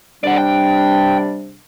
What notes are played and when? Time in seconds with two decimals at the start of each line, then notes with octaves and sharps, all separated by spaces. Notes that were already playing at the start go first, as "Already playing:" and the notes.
0.24 C3 G3 D4 D5 F#5
0.38 G5